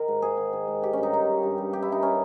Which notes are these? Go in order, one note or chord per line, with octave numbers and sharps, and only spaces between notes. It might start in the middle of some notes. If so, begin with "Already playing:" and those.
Already playing: D#3 A#4
G#2
G#2 G#4
D#3
D#3
G#2
D#3 G4
G2 C#4
D#4
D#3 D#4
G2
G2
G2
G2 G4
E4
G2 D#4
C#4